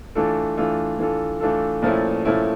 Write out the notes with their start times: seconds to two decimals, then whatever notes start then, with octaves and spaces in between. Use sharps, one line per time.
0.15 E3 A3 D4 F4 A4
0.57 E3 A3 D4 F4 A4
0.99 E3 A3 D4 F4 A4
1.40 E3 A3 D4 F4 A4
1.82 A#2 F3 A3 C#4 E4
2.25 A#2 F3 A3 C#4 E4